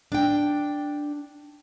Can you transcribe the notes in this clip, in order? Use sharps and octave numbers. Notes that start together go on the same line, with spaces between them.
D4 G5